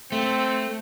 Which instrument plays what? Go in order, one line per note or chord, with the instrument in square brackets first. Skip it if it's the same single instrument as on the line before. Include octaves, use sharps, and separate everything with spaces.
[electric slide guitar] A3 [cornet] C4